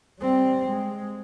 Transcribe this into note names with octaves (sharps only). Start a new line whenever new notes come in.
G3 C4
G#3